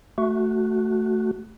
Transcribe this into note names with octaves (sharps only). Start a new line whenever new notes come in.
A3 F#4